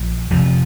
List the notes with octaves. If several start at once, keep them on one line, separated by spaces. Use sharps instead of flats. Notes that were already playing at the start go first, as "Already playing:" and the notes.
Already playing: A#1 A#2
F1 F2 C3 F3